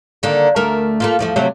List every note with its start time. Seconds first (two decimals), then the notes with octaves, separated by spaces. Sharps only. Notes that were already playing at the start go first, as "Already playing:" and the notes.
0.23 D3 D#3 A#3
0.56 D2 A3 A#4
1.00 A3 A#3 F4
1.19 E2 F3 A3
1.36 C3 F#3 A3